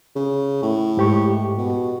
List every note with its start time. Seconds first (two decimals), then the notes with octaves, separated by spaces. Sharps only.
0.16 C#3
0.62 A2
0.97 G#2 G4 C#6
1.57 B2